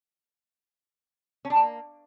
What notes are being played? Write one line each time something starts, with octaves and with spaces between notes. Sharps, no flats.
C#4
D4
A#3